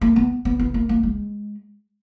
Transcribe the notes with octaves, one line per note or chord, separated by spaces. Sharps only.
A#3
B3
B3
B3
A#3
A#3
G#3